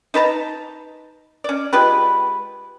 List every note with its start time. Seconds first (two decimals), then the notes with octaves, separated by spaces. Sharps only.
0.14 D#4 B4 A5 A#5
1.44 C#4 D5
1.73 G#3 F4 G4 B4